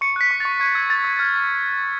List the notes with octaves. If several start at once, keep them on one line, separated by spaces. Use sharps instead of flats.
C#6 C#7
F#6 B6
C#6
A6
C#6
C#6 G#6
E6 G#6
E6 A6
E6 G#6
F6 G#6